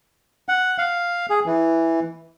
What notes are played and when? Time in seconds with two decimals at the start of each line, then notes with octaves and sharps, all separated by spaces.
0.49 F#5
0.78 F5
1.30 G#4
1.46 E3